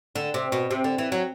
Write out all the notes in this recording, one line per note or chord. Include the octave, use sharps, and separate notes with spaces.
D3
C3
B2
C3
D3
E3
F#3